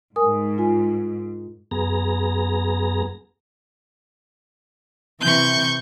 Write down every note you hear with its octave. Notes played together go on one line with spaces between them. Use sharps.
G#2 A#4 G#5 D#6
F4 G#5
F#2 B3 G#4 A#5
C3 E3 C#6 G6